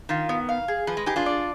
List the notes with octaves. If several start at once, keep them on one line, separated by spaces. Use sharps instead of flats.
D#3 F4
B3
F5
G#4
F3 B4
G#3
D#4 G4 G#4
D4 F4
D5